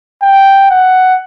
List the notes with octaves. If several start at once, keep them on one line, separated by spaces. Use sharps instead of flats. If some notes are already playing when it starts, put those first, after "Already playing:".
G5
F#5